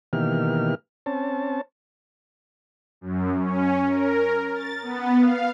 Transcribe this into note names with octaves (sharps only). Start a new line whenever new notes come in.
B2 D#3 E3 A#3 G4 F6
C4 C#4 A5
F#2
C#4
A#4
A6
B3
F5